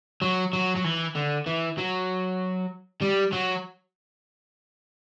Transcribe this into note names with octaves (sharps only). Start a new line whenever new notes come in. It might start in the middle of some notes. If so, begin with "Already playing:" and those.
F#3
F#3
F#3
E3
D3
E3
F#3
G3
F#3